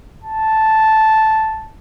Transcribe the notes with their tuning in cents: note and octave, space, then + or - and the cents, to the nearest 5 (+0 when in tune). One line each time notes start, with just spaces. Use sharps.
A5 -5